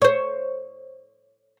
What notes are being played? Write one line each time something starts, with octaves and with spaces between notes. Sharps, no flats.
C5 C#5